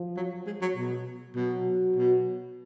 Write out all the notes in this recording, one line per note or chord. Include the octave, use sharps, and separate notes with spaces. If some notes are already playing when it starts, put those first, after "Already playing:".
Already playing: F3
F#3
G#3
F#3
B2
B2 F#3
B2